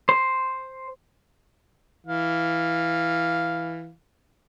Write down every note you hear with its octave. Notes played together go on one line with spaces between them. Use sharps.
C5
E3 F5